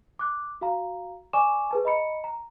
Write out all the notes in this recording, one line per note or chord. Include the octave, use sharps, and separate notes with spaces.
D6 F#6
F#4 F5 A#5
D5 G#5 C#6 D6 E7
G#4 B4 A5
D#5 A#5 B5 C#7
A#5